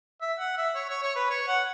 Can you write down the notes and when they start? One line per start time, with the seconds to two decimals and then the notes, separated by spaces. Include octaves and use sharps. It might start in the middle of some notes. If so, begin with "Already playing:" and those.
0.21 E5
0.39 F#5
0.57 E5
0.75 C#5
0.90 C#5
1.03 C#5
1.16 B4
1.30 C#5
1.48 F#5